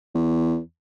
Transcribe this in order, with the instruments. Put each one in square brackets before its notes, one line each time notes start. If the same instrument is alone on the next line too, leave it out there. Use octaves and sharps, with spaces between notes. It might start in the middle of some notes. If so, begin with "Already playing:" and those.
[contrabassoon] E2